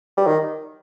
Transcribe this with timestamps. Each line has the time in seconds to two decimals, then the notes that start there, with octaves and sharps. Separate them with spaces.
0.17 G3
0.27 D#3